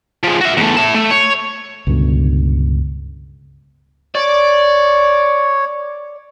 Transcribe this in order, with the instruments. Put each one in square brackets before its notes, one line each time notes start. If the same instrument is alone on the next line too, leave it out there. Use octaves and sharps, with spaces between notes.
[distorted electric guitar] F3 G#3
F#4 E5
E2 A3
E4 A5
A3
C#5
[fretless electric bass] C#2 G2 B2 D3
[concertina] C#5 [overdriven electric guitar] D5